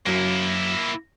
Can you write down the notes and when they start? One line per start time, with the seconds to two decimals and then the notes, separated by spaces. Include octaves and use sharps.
0.06 F#2 F#3 A#3 E4